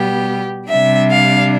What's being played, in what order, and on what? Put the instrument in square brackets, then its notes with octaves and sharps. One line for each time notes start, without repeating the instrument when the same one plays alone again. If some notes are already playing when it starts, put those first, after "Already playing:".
Already playing: [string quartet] B2 G3 B3 G4
C3 G3 D4 E5
F5